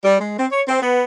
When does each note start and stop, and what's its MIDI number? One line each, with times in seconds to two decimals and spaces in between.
0.04 0.17 55
0.20 0.39 56
0.39 0.47 60
0.52 0.61 73
0.68 0.81 60
0.82 1.04 59